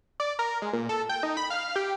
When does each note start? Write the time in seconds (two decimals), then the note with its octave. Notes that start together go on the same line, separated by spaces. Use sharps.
0.20 D5
0.39 A#4
0.62 G#3
0.73 A#2
0.89 A4
1.09 G5
1.23 D#4
1.37 B5
1.50 F5
1.76 G4